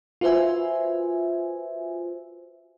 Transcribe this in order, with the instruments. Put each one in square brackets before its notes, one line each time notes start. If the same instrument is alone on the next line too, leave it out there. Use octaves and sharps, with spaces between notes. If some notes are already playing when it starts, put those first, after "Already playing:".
[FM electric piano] F4 F#4 B4 C5 E5 G#5